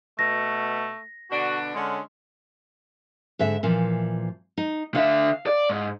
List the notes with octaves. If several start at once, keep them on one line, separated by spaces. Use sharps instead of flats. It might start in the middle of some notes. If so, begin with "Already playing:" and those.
B2 A3 A#6
B2 D3 D4 F#4
D3 G#3 C#4
G#2 D3 E5
A#2 E3 F3
D#4
D3 E5 F5
D5
G#2